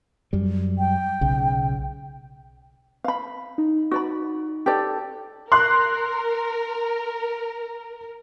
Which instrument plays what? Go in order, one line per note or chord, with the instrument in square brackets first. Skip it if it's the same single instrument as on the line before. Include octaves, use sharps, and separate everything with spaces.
[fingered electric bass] F#2 G3
[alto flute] G5
[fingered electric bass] B1 C#3
[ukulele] F5 B5
[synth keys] D#4
[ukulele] F#4 D5 B5
G4 A4 D5
[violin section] A#4 [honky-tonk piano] C6 F#6